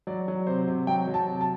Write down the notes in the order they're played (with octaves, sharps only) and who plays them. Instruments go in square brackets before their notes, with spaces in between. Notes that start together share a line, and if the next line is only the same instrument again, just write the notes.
[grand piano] F#3 D5
F#3
C3 C5
C3
F#3 G5
F#3
A5
C3
A5